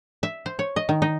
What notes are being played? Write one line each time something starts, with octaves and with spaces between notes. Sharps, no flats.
E5
C5
C#5
D#5
D#3
D#4